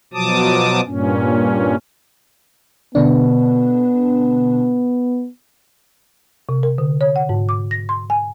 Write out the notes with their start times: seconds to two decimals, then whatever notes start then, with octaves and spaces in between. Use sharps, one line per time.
0.14 B2 F3 F#3 A5 D6 D#6
0.86 G2 A#2 C#4
2.95 B2 D3 B3 D4
6.49 C3
6.63 A#4
6.78 D3
7.01 C#5
7.16 F#5
7.29 G#2
7.49 D6
7.71 A#6
7.89 C6
8.10 G#5